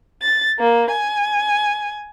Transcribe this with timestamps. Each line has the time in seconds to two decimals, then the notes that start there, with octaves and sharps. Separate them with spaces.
0.21 A6
0.59 A#3
0.91 G#5